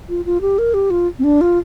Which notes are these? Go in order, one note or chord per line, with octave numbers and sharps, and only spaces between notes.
F4
F4
G4
A#4
G4
F4
C4
D4
F4